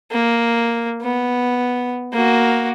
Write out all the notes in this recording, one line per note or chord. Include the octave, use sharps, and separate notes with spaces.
A#3
B3
A#3 F#4